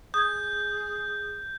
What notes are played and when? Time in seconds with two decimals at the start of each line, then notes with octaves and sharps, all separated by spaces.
0.14 G#4 D#6 G6 G#6